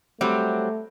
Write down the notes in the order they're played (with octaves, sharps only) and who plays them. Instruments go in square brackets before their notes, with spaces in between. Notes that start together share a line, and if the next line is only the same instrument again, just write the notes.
[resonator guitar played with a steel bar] F#3 G3 C4 [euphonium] A3